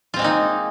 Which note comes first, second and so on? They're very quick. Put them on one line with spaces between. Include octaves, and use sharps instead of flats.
F4 C4 G#3 A#3 D#4